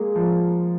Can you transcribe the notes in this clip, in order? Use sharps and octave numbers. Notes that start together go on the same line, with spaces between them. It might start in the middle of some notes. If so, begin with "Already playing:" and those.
Already playing: G#3 A#3
F3